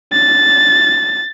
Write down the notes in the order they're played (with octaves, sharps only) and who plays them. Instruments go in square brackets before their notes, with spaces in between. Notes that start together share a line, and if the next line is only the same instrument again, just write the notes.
[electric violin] A6